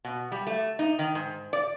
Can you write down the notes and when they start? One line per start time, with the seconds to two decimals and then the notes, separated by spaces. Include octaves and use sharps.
0.05 B2
0.32 G3
0.47 A3
0.79 D#4
0.99 D#3
1.15 G#2
1.53 D5